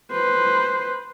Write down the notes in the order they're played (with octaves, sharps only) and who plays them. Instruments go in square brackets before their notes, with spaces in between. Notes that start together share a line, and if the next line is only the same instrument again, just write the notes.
[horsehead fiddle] B4 C5